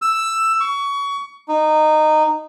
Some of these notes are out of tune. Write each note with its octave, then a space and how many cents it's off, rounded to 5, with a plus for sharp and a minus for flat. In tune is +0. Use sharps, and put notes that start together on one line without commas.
E6 +5
C#6 +25
D#4 -15